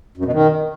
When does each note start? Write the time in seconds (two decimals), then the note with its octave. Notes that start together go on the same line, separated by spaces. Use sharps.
0.17 F#2
0.25 B2
0.33 D#3